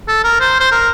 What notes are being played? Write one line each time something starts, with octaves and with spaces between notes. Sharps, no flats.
A4
A#4
C5
C5
A#4